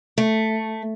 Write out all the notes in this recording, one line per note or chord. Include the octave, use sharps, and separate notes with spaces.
A3